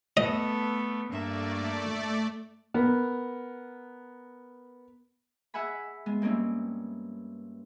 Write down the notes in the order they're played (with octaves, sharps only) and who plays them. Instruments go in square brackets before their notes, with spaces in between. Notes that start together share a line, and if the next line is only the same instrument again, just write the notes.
[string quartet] A3 B3 A4 [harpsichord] D#5
[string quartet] G2 A#3 E5 [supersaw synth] A3 D5
[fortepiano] B3 A#4
[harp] G#4 E5 F#5 G#5 B5
G#3 B3
G2 A#3 C4 C#4 E4